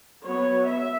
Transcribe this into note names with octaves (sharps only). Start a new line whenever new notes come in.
F#3 B3 C#5
E5